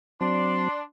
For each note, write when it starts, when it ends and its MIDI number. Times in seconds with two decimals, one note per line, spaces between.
0.21 0.68 54
0.21 0.68 60
0.21 0.82 62
0.21 0.81 84